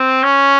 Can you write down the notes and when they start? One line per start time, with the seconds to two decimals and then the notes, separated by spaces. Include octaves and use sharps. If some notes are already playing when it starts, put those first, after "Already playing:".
Already playing: C4
0.23 C#4